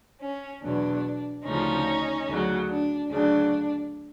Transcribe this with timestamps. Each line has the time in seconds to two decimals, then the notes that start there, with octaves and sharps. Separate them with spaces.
0.21 C#4
0.62 E2 B2 F#3 D4
1.44 D2 C#3 F3 C#4 D#4
2.27 D2 C#3 F#3
2.69 D4
3.10 D2 C#3 F#3 D4